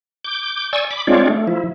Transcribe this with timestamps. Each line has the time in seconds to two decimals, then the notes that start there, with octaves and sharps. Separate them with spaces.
0.24 D6 G6
0.73 D5 G#5 C#6 E6
0.91 B5 D6
1.07 G#3 C4 D4 F4 C#5 D5
1.30 A3
1.47 F3 E4